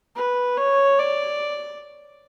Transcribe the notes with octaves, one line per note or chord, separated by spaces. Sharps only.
B4
C#5
D5